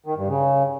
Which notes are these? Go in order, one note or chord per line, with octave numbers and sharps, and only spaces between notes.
D#3
G2
C#3